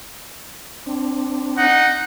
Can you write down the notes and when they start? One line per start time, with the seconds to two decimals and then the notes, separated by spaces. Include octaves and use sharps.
0.86 C4 D4
1.57 D#4 F#5